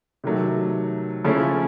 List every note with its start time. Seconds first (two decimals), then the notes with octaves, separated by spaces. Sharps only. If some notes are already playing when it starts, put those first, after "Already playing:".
0.24 C3 D#3 F#3 A3
1.24 C#3 F3 A3 C#4 E4